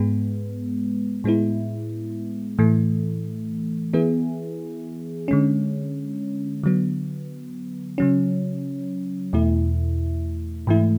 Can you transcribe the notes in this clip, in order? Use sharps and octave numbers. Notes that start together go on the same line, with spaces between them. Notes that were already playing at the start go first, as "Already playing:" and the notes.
Already playing: G#2 G#3 B3
A2 G#3 B3 E4
A2 E3 A3
E3 B3 E4 G#4
D3 G#3 C#4
D3 F#3 B3
C#3 F#3 C#4
E2 B2 A3 E4
G#2 E3 A3 E4